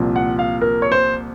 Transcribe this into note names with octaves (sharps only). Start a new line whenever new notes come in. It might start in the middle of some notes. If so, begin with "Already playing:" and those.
Already playing: C2 A#2 F3 C4
F#5
F5
A#4
C#5
C5